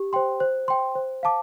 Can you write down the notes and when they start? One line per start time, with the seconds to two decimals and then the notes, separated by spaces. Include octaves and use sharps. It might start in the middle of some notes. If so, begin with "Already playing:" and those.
Already playing: G4
0.13 C5 G5 C6
0.40 C5
0.68 G5 C6
0.95 C5
1.23 F5 A5 D6